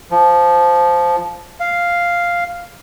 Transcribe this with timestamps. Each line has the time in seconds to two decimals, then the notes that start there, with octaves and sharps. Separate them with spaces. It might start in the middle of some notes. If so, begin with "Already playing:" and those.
0.11 F3
1.60 F5